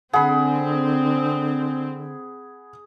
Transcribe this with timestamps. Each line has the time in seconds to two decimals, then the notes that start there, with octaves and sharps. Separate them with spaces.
0.14 D3 C4 G#4 F#5 B5